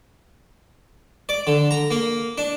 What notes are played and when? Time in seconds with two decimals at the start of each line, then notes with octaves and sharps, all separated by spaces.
1.29 D5
1.47 D3
1.71 A#5
1.91 A#3
2.38 D4